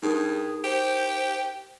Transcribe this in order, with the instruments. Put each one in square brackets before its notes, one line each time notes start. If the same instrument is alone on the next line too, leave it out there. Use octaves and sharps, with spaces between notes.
[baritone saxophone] G2 [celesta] D#4 A#4 [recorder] G#4
[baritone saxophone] G4 [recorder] C5